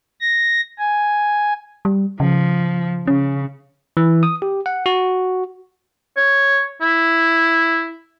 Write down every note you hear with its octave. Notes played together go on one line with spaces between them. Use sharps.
A#6
G#5
G3
C#3 F3
C#3 C#4
E3
D#6
G4
F#5
F#4
C#5
E4